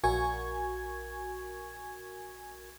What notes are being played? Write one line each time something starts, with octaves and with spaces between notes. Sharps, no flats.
A#1 F#4 A#4 G#5 C#6 G#6